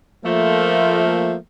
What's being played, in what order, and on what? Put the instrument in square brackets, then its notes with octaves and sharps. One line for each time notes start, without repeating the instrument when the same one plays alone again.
[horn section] F3 A3 A#3